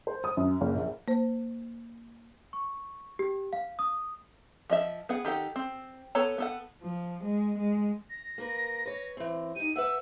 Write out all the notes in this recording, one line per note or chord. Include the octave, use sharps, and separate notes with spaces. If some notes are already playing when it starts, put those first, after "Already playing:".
C5
D#6
F#2
F#1
A#1
A#3 C5
C#6
G4
F5
D#6
F3 D#5 E5
B3 G#4 F#5
D#3 G4 A4 F#5
C4
B3 A4 C#5 A#5
B3 A4 F#5
F3
G#3
G#3
A#6
A#3 A#4 B4
B4 C#5
E3 C4
D#4 G4 D#7
B4 E5 F#5 E6